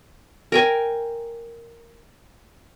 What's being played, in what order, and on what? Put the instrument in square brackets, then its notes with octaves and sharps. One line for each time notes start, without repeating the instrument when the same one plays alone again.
[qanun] A#4 G5 G#5